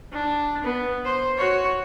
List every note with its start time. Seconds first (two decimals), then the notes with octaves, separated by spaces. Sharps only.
0.12 D4
0.64 B3
1.05 C5
1.37 F#4 C#5